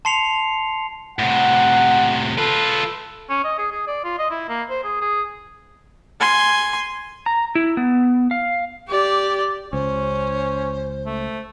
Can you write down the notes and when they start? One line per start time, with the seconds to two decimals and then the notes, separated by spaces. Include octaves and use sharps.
0.05 A5 C6 C7 C#7 F7
1.19 A2 C3 F#5
2.38 F4 A4 B4
3.30 C#4
3.45 D#5
3.59 G#4
3.72 G#4
3.88 D5
4.04 F4
4.19 D#5
4.31 E4
4.49 A#3
4.70 C5
4.84 G#4
5.01 G#4
6.21 G#5 C6
7.26 A#5
7.55 E4
7.77 B3
8.31 F5
8.88 G4 D5
9.73 C#2 C#4 C5
11.06 A3